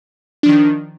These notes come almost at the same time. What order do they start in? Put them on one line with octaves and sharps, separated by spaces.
D4 F3 D#3